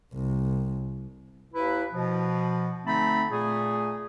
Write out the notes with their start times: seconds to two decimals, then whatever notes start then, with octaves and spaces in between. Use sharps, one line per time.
0.14 C2
1.54 D#2 E4 B4
1.92 B2 F3
2.85 D3 A3 C4 D#4 A5 B5
3.30 A#2 A3 G#4